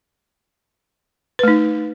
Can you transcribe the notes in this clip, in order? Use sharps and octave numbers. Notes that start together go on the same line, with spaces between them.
A3 D#4 B4